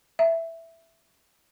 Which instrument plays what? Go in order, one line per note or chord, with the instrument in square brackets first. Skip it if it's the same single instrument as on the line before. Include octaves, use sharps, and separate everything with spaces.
[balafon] E5